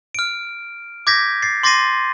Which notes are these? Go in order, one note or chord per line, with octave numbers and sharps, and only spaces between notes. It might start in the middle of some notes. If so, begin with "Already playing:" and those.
F6 D7
D6 G6 G#6 A#6 B6
A6 C7
C6 D6 A6 A#6 C7 D#7